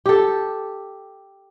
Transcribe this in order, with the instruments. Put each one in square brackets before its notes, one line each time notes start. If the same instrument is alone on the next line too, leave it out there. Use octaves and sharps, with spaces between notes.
[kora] G4 A4